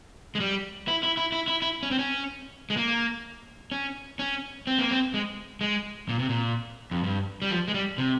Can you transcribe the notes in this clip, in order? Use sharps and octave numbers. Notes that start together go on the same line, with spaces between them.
G#3
G3
E4
E4
E4
E4
E4
E4
C#4
C4
C#4
G#3
A#3
C#4
C#4
C4
A#3
C4
G#3
G#3
A#2
C3
A#2
F2
G2
G3
F3
G#3
G3
C3